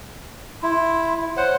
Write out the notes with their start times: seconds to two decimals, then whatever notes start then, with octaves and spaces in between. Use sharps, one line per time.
0.63 E4 C6
1.37 C5 C#5 F#5